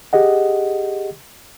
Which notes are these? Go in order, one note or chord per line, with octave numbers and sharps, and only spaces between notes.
G4 G#4 D#5 F#5